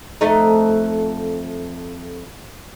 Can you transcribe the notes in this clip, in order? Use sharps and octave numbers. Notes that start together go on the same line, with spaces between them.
F2 A3 D#4